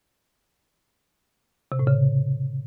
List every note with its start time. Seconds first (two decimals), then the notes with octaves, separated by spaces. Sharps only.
1.72 C3
1.79 A2
1.87 C#3